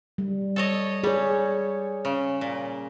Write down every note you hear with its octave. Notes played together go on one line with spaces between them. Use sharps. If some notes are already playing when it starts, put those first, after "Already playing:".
G3
A4 C#5 D#5
G3 G#4 C#5
C#3
A#2